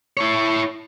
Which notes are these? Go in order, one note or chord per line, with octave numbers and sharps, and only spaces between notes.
E4 C#5